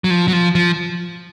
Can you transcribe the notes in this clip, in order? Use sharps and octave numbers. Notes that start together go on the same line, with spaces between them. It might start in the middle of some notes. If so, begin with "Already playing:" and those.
F#3
F3
F#3
F3
F3